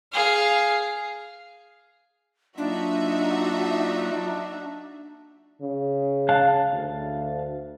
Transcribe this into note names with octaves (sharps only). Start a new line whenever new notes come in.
G#4 F5
F#3 A#3 D4 D#4 F4 F#4 E5
C#3
F5 A5 F#6
D2